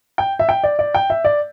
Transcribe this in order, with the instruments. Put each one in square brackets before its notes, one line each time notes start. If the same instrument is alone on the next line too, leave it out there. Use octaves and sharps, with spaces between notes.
[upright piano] G5
E5
G5
D5
D5
G5
E5
D5